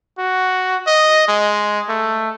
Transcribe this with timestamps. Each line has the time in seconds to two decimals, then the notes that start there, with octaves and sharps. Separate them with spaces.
0.18 F#4
0.87 D#5
1.28 G#3
1.89 A3